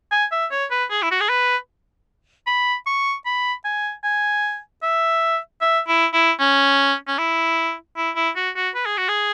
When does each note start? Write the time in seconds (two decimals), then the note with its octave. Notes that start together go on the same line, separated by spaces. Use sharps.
0.11 G#5
0.32 E5
0.51 C#5
0.71 B4
0.90 G#4
1.02 E4
1.11 F#4
1.20 G#4
1.29 B4
2.47 B5
2.86 C#6
3.25 B5
3.65 G#5
4.03 G#5
4.82 E5
5.61 E5
5.88 E4
6.13 E4
6.39 C#4
7.07 C#4
7.18 E4
7.96 E4
8.16 E4
8.36 F#4
8.56 F#4
8.75 B4
8.86 G#4
8.97 F#4
9.08 G#4